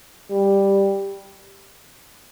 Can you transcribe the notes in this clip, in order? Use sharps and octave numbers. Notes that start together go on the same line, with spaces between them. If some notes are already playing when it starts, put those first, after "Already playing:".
G3